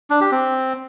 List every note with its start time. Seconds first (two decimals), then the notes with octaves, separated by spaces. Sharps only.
0.10 D4
0.21 G4
0.31 C4